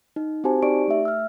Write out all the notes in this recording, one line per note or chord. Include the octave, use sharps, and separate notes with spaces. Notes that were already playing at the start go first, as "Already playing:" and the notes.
D#4
C4 F#4 G4 C5 G#5 A5
D#4 G4 D5 C#6 D7
A3 E5
E6 F6